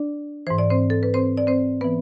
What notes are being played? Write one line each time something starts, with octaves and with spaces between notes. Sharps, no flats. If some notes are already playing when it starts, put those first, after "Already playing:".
Already playing: D4 D5
G#2 E3 C5
D5
C4 C5
A4
B4
C4 C5
D5
C4 C5
E3 B3 B4